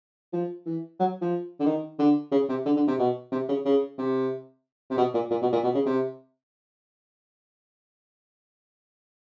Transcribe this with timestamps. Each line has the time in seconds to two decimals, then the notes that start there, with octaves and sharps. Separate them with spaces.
0.33 F3
0.66 E3
1.00 F#3
1.21 F3
1.60 D3
1.66 D#3
1.99 D3
2.32 C#3
2.49 C3
2.66 D3
2.77 D3
2.88 C3
2.99 B2
3.32 C3
3.48 C#3
3.65 C#3
3.98 C3
4.90 C3
4.97 B2
5.14 A#2
5.30 A#2
5.42 B2
5.53 A#2
5.64 B2
5.74 C#3
5.86 C3